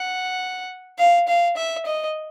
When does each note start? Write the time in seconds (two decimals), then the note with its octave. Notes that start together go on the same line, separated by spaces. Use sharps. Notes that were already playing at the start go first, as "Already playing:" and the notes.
Already playing: F#5
0.99 F5
1.28 F5
1.57 E5
1.86 D#5